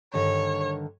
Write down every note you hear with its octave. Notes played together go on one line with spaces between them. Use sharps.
G2 D3 D#3 C#5